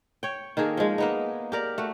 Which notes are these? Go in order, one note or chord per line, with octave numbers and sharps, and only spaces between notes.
C#5 G5
D#3 A#3 G#4 A4
F3 G#3
A#3 B3 D#4
G4 A#4 D5
A3 F#4